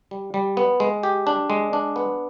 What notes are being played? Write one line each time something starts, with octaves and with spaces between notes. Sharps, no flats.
G3
G3
B3
G#3
G4
D4
G#3
D4
B3